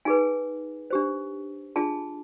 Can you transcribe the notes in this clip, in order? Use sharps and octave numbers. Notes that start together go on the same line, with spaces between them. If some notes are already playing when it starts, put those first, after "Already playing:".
D#4 G#4 B4 G#5
D4 G4 C5
D4 F4 G#4 A5